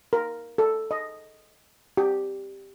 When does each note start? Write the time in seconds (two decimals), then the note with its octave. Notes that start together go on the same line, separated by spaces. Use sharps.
0.13 A#4
0.58 A4
0.91 D#5
1.97 G4